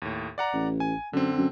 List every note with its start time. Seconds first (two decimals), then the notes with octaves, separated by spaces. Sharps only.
0.02 D#2 A2
0.38 D5 F#5 A#5
0.53 A1
0.80 G#5
1.13 F#2 D3 C4
1.38 F#2